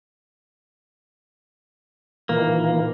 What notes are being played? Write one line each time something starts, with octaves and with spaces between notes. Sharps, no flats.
A#2 D#3 E3 A#3